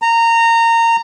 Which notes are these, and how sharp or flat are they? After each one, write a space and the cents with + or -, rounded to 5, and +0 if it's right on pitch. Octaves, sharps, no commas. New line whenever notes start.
A#5 -20